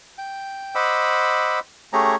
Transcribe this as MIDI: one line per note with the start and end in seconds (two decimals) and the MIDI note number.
0.18 0.75 79
0.75 1.59 72
0.75 1.59 75
0.75 1.59 78
0.75 1.59 83
0.75 1.59 86
0.75 1.59 88
1.93 2.16 57
1.93 2.16 61
1.93 2.16 67
1.93 2.16 68
1.93 2.16 73
1.93 2.16 82